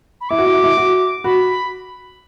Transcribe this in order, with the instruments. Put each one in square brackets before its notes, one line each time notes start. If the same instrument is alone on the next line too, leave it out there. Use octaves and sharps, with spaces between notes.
[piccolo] B5
[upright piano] E4 [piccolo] D6
[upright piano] F#4
E4
F#4
E4
F#4
[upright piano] F#4 [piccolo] B5